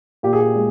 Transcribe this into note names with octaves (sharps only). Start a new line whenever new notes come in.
A#2 G4
G#4
G4
G#3